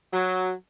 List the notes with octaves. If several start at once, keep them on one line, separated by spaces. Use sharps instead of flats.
F#3